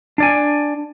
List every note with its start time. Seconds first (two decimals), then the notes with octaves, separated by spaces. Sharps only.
0.18 D4 D5 G#5